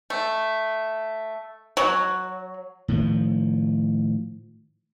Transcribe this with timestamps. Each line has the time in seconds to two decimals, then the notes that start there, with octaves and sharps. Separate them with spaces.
0.10 A3
1.77 F#3
2.88 A2 D#3 F3